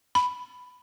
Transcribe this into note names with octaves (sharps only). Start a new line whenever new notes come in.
B5